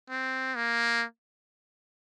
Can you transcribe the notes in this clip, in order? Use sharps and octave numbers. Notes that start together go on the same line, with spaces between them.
C4
A#3